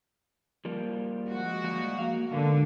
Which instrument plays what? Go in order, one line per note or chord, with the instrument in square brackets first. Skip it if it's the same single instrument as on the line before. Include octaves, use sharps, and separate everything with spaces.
[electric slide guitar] F3 G3 A#3
[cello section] G#3 F#4
[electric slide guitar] F3 G3 A#3
A#3 F5
[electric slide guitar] G#2 B2 A#3 [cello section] D3